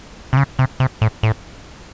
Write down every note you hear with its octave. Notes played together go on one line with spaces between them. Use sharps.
C3
C#3
C3
C3
A2
A2